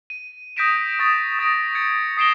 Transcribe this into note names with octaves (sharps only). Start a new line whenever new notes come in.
D#7
D#6 G6 A#6 B6 D7 E7
C#6 D#6 A6 E7
D#6 A6 A#6 D7
G#6 A6 C#7
D#6 A#6 C7 D7 E7 G7